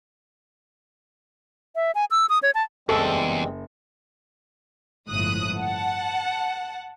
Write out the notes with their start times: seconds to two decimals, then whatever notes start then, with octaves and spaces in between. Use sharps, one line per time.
1.75 E5
1.95 G#5
2.11 E6
2.29 D#6
2.43 C#5
2.55 A5
2.89 F#1 E2 G2 G#3 C4 A4
5.09 G1 C#2 A2 F3 D#6 F#6
5.58 F#5 A5